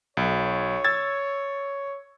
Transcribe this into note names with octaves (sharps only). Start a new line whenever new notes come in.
B1 C#5
E6 G#6 A6